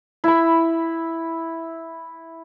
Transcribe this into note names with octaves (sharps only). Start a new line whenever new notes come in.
E4 B5